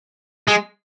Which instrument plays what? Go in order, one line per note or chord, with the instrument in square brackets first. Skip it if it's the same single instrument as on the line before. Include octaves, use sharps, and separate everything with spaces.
[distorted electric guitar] G#3